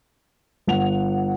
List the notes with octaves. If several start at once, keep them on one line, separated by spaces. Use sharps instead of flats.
G1 F#5 F7